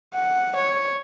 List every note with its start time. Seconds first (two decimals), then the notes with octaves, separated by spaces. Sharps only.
0.14 F#5
0.56 C#5